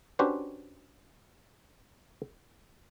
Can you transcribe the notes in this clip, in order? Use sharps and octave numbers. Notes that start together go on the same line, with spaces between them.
C#4 D4 F#4 G4 B4 C5